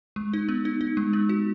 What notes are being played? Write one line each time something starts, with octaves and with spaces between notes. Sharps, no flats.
G#3
D#4
B3
D#4
D#4
G#3
B3
F#4